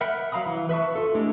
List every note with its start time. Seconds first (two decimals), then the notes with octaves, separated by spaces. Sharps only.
0.01 A#4 E5 F#5 G5 B5
0.32 F#3 F5 A#5 B5 D#6
0.46 E3
0.69 B4 E5 A5 C#6
0.95 F4 A4
1.15 G#3 A3 D4 E4 G4